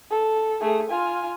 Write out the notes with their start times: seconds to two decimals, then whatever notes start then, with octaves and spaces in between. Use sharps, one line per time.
0.11 A4
0.61 A3 G#4
0.90 F4 G#5